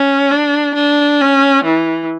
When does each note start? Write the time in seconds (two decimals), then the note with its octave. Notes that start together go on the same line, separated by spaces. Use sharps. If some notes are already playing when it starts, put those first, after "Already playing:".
Already playing: C#4
0.31 D4
0.75 D4
1.21 C#4
1.65 E3